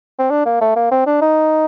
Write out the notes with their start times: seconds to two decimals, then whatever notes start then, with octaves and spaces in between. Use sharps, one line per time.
0.19 C4
0.30 D4
0.45 A#3
0.61 A3
0.76 A#3
0.92 C4
1.07 D4
1.22 D#4